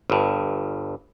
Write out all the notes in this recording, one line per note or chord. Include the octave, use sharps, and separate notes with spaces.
G1 G2